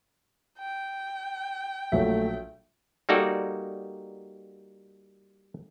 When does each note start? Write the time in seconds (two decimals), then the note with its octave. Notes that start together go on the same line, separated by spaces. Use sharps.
0.58 G5
1.92 A#1 F#3 A3 E5
3.09 G3 A#3 D#4 F#4 A4 D5